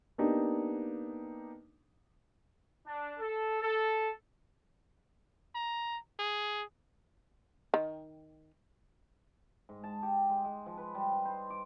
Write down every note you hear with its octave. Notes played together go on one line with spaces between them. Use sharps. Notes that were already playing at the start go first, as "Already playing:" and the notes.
A#3 B3 D4 D#4 G4
D4
A4
A4
A#5
G#4
D#3
G#2
A5
G4
G#3
G#3
F3
B4
G3
D#4
C5
D6